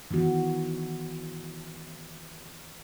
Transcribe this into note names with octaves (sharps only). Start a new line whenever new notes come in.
D#3 E3 B3 F#4